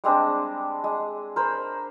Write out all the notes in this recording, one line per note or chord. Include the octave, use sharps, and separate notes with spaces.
G3 G#3 C4 D4
G#3
A#4 C5 B5